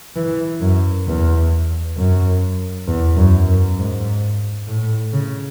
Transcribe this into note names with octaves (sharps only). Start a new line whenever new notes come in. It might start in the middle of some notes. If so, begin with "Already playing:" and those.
E3
F#2
E2
F#2
E2
F#2
F#2
G#2
A2
C#3